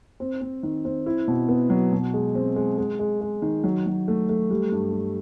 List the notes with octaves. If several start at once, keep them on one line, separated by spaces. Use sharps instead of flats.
C4
C4
D#3
C4
E4
B2
B3
F#3
B2
G#3
C4
G#3
G#3
G#3
G#3
D#3
F#3
F#3
A3
A3
G3
G2
G3